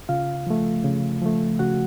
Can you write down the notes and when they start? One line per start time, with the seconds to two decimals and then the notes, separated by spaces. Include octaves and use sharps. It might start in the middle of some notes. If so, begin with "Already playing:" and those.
0.09 C#3 F4 F5
0.47 F3 A3
0.84 C#3
1.21 F3 A3
1.59 C#3 F#4 F#5